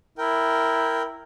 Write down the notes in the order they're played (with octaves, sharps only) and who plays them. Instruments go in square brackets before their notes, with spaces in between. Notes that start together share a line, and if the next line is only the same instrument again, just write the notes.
[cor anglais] E4 [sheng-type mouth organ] A#4 G5